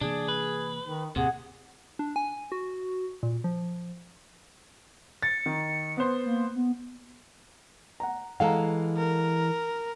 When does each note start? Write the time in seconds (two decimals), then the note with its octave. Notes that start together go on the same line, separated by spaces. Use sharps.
0.01 C3 E3 A#3 D4 G#4
0.28 B4
0.85 D#3 D#4
1.16 D#2 A2 C3 A#3 G#4 F#5
1.99 D4
2.16 G#5
2.52 F#4
3.23 A#2
3.44 F3
5.23 A6 C#7
5.46 D#3
5.97 B3 C5
6.26 A#3
6.56 B3
8.00 F#5 A#5
8.40 E3 G#3 A4 F5 F#5 A#5
8.97 A#4